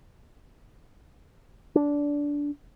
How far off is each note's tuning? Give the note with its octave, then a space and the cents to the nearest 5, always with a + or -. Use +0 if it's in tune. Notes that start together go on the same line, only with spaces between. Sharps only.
D4 -15